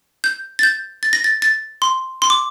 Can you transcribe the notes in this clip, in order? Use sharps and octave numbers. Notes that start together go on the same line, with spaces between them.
G6
A6
G6
A6
A#6
A6
A6
C6
C6
D6